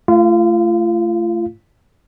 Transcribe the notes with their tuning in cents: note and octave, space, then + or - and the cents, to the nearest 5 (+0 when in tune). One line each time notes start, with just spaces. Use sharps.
A3 +0 F4 -35 F5 +0